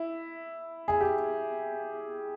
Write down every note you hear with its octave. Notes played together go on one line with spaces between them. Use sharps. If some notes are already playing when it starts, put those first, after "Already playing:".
Already playing: E4
G#4
G4